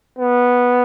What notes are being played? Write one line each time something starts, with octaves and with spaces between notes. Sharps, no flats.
B3